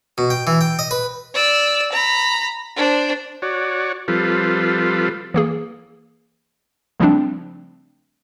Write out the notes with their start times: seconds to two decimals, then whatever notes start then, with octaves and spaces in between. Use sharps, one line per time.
0.18 B2
0.30 G5
0.47 E3
0.61 G5
0.79 D#5
0.91 B4
1.34 D5 E6
1.92 A#5 B5
2.76 D4 C5
3.42 F#4 C#5 D5
4.08 F3 G3 C4 F4 A4 B4
5.34 E3 A#3 G#4
7.00 C#3 F3 G3 A3 C4 D4